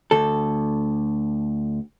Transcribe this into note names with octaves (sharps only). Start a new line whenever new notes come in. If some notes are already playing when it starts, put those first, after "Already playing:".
D2 A4